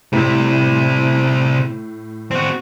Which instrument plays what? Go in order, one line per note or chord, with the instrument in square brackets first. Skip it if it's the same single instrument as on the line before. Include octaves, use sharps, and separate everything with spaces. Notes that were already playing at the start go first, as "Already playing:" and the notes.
[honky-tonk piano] A2 [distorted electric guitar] C3 E4
[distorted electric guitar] C4 F#4